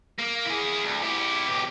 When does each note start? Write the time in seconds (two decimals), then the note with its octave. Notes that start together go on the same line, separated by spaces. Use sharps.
0.19 A#3
0.45 E4 G#4
0.83 D2
1.02 E4 G4
1.47 B1 G4